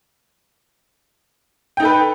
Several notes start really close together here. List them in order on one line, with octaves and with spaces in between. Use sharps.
G5 D#4 A4 B4